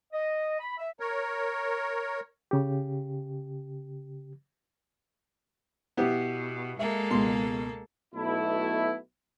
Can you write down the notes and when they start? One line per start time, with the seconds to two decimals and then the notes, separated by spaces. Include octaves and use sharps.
0.12 D#5
0.60 B5
0.79 E5
1.00 A#4 C#5
2.51 C#3 G4
5.97 B2 B3 E4 G4
6.79 G#3 A#3 A4 E5
7.11 C#2 B2 C6
8.14 B1 B2 A3 E4